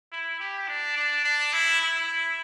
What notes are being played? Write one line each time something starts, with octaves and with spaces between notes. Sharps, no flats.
E4
G4
D4
D4
D4
E4
E4